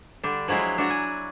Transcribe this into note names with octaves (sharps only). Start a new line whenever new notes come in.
D3 G3 D4
F3 F#3 G#3 E4 F4
D4 F#4 A#5
G#5